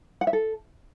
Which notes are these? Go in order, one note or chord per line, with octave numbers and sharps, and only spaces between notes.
F#5
E5
A4